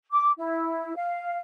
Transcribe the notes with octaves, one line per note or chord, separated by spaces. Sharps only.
D6
E4
F5